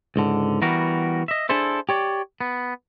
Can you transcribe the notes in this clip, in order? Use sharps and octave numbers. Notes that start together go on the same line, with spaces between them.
C#2 G#2 D3
E3 G3 B3 F#4 A#4
D#5 E5
D4 E4 G#4 A4 C5 E5
G4 C#5 D5
B3